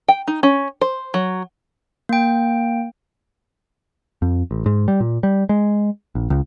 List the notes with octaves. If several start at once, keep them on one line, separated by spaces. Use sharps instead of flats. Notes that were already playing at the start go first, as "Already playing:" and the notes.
G5
D#4
C#4
C5
F#3
A#3 G5
F2
A1
G#2
G3
A#2
G3
G#3
A#1
C#2